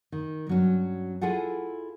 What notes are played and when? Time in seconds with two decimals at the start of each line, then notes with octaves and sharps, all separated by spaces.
0.12 D#3
0.47 G2 F#3 C#4
1.21 E4 F4 G#4 A4 F#5